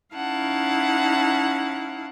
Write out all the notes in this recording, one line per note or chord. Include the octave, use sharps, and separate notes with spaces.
C#4 D#4 E4 F5 F#5 A5